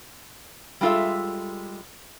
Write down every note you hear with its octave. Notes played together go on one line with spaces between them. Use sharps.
G3 G#3 F4 A4 E5